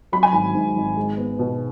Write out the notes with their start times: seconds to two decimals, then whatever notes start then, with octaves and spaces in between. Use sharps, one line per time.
0.12 F#3 B5
0.23 G#5
0.33 G#1 B5
0.55 G#2
0.76 G#1
0.97 G#3
1.17 B3
1.39 B2